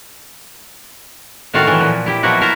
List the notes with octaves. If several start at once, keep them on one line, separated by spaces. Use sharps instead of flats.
A2 D#3 C4 F#4 F5 A5
E3 F#3
A#2 F3
E4 G4
B2 F3 F#3 A#3 E4 F#4
E4 A#4 C5 E5 A5 A#5